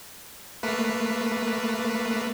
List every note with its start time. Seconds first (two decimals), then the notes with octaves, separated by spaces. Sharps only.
0.63 A3 A#3 B4